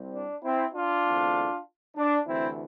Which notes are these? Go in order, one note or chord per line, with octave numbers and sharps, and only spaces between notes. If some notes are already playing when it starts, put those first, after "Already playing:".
Already playing: C2 C3 G3 C4
D4
C4 E4
D4 F4
E2 D3 A3 C4
D4
D2 C3 E3 C4 E4